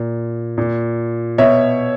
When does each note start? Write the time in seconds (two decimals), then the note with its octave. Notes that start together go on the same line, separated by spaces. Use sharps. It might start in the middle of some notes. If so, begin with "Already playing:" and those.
Already playing: A#2
0.58 A#2
1.38 B2 C#5 E5